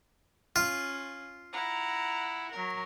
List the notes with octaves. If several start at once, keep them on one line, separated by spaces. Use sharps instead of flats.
C#4 F4
E4 F#5 A#5
F#3 A#4